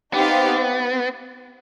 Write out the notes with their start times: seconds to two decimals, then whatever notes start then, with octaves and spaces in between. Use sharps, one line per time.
0.14 B3 C4 D#4 G4 C5 F5